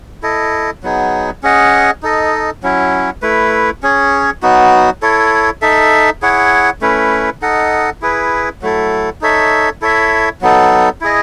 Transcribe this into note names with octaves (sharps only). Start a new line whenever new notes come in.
E4 A4 D#5
F#3 B3 D#4 G#4
C#4 G#4 D#5 F#5
D#4 A4 D#5
F#3 C#4 E4
A3 E4 B4
C#4 G#4 C#5
F#3 B3 D#4 F#4
E4 A4 C#5
D#4 A4 E5
E4 G#4 C#5 F#5
A3 C#4 E4 B4
D#4 A4 D#5 F#5
E4 G#4 B4
F#3 A3 E4 A4
D#4 A4 C#5 E5
E4 A4 C#5 E5
F#3 B3 D#4 A4
E4 G#4 D#5